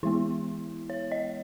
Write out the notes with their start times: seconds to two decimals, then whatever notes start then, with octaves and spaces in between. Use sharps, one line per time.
0.03 E3 G#3 B3 E4
0.90 C#5
1.12 D#5